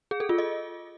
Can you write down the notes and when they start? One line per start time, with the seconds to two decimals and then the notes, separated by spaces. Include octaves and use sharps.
0.11 G#4
0.20 A4
0.29 F4
0.38 D#5